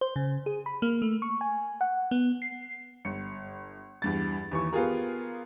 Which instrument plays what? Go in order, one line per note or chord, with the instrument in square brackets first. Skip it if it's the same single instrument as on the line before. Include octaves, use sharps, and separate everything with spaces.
[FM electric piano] C5
C#3
G#4
B5
A#3
A3
C#6
G#5
F#5
B3
C7
[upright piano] G1 C#7
E2 G2 A6
D#2 E3 C#6
B3 F4 G4 G#4 A#4